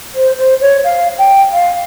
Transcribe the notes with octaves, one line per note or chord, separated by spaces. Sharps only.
C5
C5
C#5
F5
G5
F5